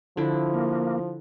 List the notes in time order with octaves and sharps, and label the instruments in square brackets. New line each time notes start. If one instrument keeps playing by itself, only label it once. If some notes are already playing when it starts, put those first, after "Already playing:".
[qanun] D3 E4 [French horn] F3
[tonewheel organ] A#3